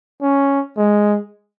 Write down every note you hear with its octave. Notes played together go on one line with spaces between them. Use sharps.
C#4
G#3